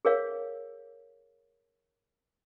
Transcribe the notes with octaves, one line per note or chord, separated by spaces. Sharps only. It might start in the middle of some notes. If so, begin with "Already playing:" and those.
G#4 A#4 C#5 F5